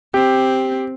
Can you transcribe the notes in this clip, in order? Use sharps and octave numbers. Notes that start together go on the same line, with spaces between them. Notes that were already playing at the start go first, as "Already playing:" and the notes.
C4 G4